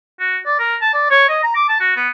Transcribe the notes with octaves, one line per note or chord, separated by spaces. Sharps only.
F#4
D5
A#4
A5
D5
C#5
D#5
A#5
D6
A5
F#4
B3